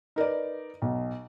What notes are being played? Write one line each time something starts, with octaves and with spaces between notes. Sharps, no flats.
D#4 A#4 B4 D5
B1